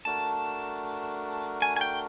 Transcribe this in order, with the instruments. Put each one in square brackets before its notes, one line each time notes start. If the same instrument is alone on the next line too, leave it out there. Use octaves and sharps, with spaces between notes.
[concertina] A3 D4 F#4 A#4 [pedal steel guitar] A5
[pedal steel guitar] G#5
G#5
G5